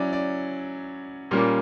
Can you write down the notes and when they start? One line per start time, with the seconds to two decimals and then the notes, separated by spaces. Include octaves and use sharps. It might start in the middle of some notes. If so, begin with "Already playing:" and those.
Already playing: F#3 C#4 E4 D5
0.13 D5
1.31 A#2 G3 A#3 C#4